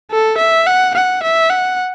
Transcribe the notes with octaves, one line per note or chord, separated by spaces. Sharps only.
A4
E5
F#5
F#5
E5
F#5